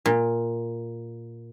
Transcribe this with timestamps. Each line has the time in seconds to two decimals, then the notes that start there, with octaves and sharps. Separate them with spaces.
0.06 A#2